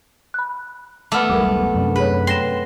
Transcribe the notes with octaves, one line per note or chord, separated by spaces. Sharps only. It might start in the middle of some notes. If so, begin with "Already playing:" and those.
B5 F#6
A3 B3 D6 F6
E1 B1 G3 A#4 D6
F#2 C3 D4
G#4 B4 C#5
G5 C6 A#6 E7